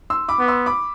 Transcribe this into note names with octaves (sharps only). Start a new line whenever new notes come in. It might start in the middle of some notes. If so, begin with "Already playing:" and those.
C6 E6
B5 D6
B3
C6 E6
B5 D6